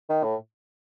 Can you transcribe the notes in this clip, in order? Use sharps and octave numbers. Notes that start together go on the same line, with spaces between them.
D#3
A2